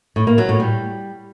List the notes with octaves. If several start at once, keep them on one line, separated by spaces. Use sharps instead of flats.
A2
A#3
F#3
A2
G3